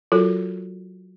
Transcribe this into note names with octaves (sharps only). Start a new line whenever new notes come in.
F#3 F4 F#4 A4 A#4